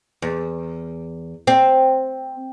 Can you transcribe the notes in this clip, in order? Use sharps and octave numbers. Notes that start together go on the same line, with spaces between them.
E2
C4